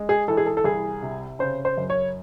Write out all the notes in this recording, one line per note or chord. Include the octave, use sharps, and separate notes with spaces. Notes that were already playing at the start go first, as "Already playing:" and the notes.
Already playing: G#3
G#4
E3 A4
G#4
A4
A4
C2 G#4
C3
C#3 C5
C5
F#2
C#5